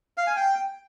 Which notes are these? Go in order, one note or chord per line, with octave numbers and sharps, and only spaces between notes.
F5
G#5
G5